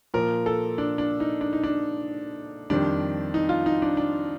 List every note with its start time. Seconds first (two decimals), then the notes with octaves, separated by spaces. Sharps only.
0.14 A#2 F3 A#4
0.46 A4
0.78 D4
0.98 D4
1.20 D#4
1.41 D4
1.53 D#4
1.64 D4
2.70 F2 D#3 G3 D4
3.34 D#4
3.49 F4
3.66 D#4
3.82 D4
3.97 D4